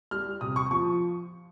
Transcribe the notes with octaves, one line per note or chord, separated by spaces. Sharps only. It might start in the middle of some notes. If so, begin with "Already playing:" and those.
G3 F6
C3 D#6
C#6
F3 C#6